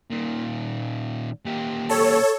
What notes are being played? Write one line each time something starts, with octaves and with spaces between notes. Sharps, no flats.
A#2 D#3
A#2 G4
A4 C#5